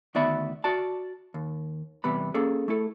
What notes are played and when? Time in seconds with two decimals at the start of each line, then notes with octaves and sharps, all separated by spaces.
0.15 D2 D#3 B3 D5 E5 B5
0.64 F#4 D5 A5
1.34 D#2
2.04 E2 C3 G3 B3 B5
2.34 A#3 C#4 G#4 A4
2.68 A3 E4 A4